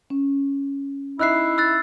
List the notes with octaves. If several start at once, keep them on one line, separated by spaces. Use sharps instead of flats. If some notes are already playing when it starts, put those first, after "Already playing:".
C#4
D#4 E4 E5 E6 F#6 C7
E6 F#6 A6